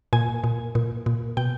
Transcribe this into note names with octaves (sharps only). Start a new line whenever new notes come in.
A#2 G#5
A#2
A#2
A#2
B2 G5